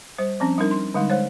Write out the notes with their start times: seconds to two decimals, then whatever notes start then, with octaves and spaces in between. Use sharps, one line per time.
0.18 G3 C5
0.40 F3 C4 C#4
0.58 G3 D4 D#4 A#4
0.71 C6
0.94 D3 G3 G#3 D#4
1.10 G#3 C5 C#5